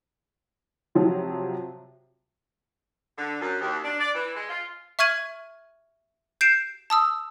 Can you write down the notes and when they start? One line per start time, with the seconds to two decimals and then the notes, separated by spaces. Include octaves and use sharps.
0.95 C3 F3 F#3
3.18 D3
3.41 F#2
3.61 D#2
3.84 D4
4.00 D5
4.15 E3
4.36 G#3
4.49 F4
4.99 E5 C#6 F6 G#6 D#7 F#7
6.41 G6 C7 D7 E7
6.90 A5 D#6 E6